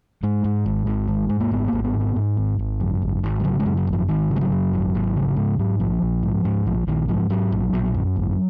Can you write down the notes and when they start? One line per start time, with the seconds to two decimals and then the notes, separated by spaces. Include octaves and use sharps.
0.23 G#2 G#3
0.44 G#2
0.66 G#1
0.86 G#1
1.08 G#2
1.29 G#2
1.41 A#3
1.51 G#1 B3
1.68 G#1 A#3
1.84 B3
1.94 G#2
2.00 B3
2.16 G#2
2.37 G#1
2.59 G#1
2.80 F#2
3.02 G#1
3.23 G#1
3.40 G#3
3.44 C#3 F#3
3.60 G#3
3.66 F#2
3.77 F#3
3.87 G#1
3.93 F3
4.08 G#1 D#3
4.30 C#3
4.36 G#3
4.41 F#3
4.52 F#2
4.73 G#1
4.95 G#1
5.16 C#3
5.37 G#2 G#3
5.59 G#2 F#3
5.80 A#1 F3
6.02 A#1
6.23 G#2
6.45 G#2
6.66 A#1 F3
6.87 A#1 D#3
7.08 G#2 F3
7.30 G#2 F#3
7.52 A#1
7.73 A#1
7.94 F#2
8.16 G#1